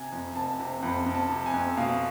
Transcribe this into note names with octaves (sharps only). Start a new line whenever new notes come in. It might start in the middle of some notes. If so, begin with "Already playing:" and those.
Already playing: C3 G#5
F2
F1 A5
C3
F2 B5
F2
A5
C3
G#5
F2
B2 F5